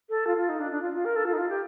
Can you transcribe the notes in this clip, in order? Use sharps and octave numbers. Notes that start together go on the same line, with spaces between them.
A4
F4
F4
D#4
D4
D4
F4
F4
A#4
A4
F4
D#4
F4
G4